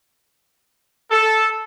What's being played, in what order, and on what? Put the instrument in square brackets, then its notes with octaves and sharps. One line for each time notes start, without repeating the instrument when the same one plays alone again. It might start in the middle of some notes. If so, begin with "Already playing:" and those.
[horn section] A4